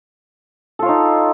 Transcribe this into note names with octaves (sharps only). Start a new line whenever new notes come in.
D#4 F4 A4 C#5